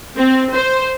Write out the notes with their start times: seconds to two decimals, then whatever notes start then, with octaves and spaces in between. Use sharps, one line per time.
0.16 C4
0.54 C5